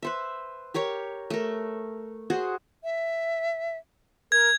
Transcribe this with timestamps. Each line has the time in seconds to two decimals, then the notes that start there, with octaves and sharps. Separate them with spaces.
0.02 B4 C5 E5
0.74 G4 A#4 C#5 C#6
1.30 A3 A#4
2.30 F#4 G#4 C5
2.84 E5
4.32 A#4 G#6